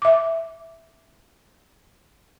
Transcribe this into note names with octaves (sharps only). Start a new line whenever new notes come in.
E5 D6